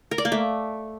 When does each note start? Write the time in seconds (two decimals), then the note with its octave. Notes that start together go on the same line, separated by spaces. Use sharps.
0.11 A#4
0.18 D5
0.25 A#3
0.32 A3